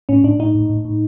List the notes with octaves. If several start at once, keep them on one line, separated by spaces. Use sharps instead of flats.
A2 C#4
A2 D4
A2 D#4
A2
A2
A2